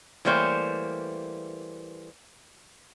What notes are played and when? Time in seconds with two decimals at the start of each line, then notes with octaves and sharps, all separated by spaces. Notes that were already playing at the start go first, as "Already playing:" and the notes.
0.25 E3 G3 A3 A#3 C5 C#5